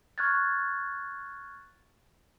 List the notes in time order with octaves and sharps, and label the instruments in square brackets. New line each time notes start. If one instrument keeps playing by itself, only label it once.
[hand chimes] C#6 F6 F#6 G#6 A6